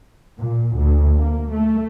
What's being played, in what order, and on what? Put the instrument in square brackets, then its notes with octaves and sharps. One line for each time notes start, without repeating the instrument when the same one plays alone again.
[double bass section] A#2
D2
A#3
A3